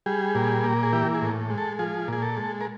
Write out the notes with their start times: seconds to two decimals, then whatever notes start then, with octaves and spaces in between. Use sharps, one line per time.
0.06 G3 G#4
0.35 A#2
0.64 A#3
0.83 G#4
0.93 E3 G4
1.15 G#4
1.21 A2
1.50 G#3
1.58 A4
1.79 F3 G#4
2.08 A#2 G#4
2.22 A4
2.37 G#3
2.61 A#4